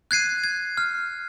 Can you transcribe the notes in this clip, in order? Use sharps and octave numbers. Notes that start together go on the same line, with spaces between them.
F#6 G#6 C7 D#7
G#6
F6